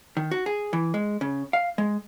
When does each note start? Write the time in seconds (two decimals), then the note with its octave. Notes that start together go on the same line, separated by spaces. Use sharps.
0.17 D#3
0.31 F#4
0.46 G#4
0.73 E3
0.94 G#3
1.21 C#3
1.53 F5
1.78 G#3